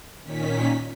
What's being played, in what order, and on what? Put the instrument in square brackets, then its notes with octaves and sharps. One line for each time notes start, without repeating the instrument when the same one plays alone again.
[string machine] A#2 D#3 C#4 B6